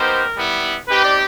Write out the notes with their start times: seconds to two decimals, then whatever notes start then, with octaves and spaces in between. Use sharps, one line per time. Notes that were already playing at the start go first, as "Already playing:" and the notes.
Already playing: B3 D#4 G4 A#4 C5
0.36 G3 B3 E4
0.87 C4 D#4 G4 B4
1.04 D5